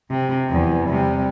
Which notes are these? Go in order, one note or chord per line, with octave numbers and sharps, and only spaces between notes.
C3
E2
C3 G3